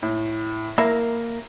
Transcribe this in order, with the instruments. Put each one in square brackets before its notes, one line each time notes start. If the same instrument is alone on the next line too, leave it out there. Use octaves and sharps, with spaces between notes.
[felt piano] A2
[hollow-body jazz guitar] A#3 [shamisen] E4 [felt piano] A#4